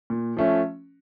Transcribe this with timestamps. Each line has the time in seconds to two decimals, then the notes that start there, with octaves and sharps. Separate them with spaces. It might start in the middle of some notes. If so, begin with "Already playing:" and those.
0.10 A#2
0.37 F3 A3 C#4